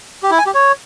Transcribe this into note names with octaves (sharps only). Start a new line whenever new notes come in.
G4
E4
G#5
G4
C#5